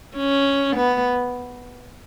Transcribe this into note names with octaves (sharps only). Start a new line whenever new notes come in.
C#4
B3